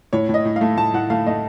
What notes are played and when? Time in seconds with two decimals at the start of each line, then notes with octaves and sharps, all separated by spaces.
0.13 A2 C#5
0.29 A2
0.34 D#5
0.45 A2
0.56 F5
0.61 A3
0.77 A2 A5
0.94 A2 F#5
1.10 A3 F5
1.26 A3 D#5